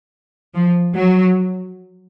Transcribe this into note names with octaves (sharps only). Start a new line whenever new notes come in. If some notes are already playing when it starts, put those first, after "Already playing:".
F3
F#3